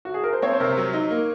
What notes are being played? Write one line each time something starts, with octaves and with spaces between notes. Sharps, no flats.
F#4
G#4
A#4
C5
C4 C#5
C5
C3 A#4
F#3
D#4
A#3